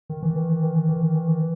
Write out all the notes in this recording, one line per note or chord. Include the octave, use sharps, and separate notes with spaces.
D#3
E3
D#3
E3
D#3
E3
D#3
E3
D#3
E3